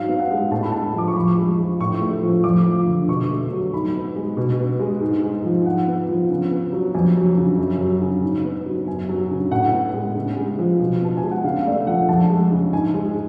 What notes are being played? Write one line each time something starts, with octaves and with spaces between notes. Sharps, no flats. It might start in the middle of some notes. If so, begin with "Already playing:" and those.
Already playing: G#2 F#3 F5
B3
F#5
G#3
A2 A5
B5
G#3 A5
F3 D6
C#6
F2 B5
G#3
F3
A2 C#6
A3
F3
F2 D6
F3
D3
B2 C#6
A3
F#3
G#2 B5
B3
G#3
B2
B3
G#3
G#2
G#3
F3
G#2 F#5
B3
F3
C#3
B3
F#3
F2 G#5
F#3
C#3
F#2
F#3
C#3
G#2
B3
F#3
F#2 G#5
F#3
C#3
A2 F#5
B3
G#3
C#3
G#3
F3
B2
B3 A5
G#5
G#3
F#5
C#3 F5
A3 D5
F3 F#5
F2 A5
G#3
C#3
G#2 G#5
G#3